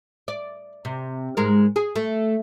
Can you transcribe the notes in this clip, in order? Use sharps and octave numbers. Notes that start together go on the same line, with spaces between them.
D5
C3
G#2 G#3 A#4
G#4
A3